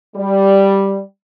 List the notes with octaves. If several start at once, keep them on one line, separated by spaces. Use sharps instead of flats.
G3